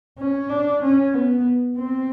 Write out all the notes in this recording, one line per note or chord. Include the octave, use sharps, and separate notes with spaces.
C#4
D4
C#4
B3
C4